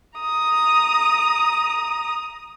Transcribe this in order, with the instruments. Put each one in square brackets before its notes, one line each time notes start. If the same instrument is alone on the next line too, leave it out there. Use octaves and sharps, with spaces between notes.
[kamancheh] A#5 D#6